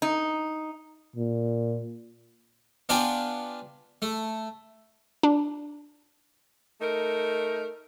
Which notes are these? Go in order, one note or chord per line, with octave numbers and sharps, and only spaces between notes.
D#4
A#2
B3 D4 F4 D5 G5 G#5
A3
D4
A3 D#4 A#4